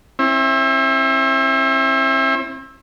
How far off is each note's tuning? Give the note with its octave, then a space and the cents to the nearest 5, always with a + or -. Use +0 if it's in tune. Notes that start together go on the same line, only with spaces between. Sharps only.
C4 +45 E4 +0